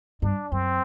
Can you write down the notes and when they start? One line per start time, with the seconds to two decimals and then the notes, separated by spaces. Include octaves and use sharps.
0.22 G2 D4
0.52 F#2 C4